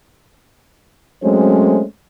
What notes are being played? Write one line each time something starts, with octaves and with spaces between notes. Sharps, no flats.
F#3 G#3 A3 C4 C#4 C5